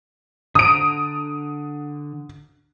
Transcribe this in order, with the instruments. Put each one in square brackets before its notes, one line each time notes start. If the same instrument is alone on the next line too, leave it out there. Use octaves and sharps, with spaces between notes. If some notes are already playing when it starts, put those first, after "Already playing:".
[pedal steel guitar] D3 A#5 [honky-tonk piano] D#6 D7